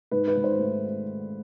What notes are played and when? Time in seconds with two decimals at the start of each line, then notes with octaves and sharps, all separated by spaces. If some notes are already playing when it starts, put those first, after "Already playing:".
0.11 G#2 B4
0.28 B4
0.36 G#2
0.44 C5
0.59 A3